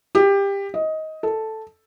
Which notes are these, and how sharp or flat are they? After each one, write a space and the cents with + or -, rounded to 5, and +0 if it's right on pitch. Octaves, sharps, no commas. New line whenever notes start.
G4 +20
D#5 +15
A4 +0